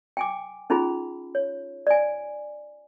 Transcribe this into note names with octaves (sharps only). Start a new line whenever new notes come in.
G5 G#5 D6
C#4 D#4 F4 G#4 B5
C#5
D5 G#5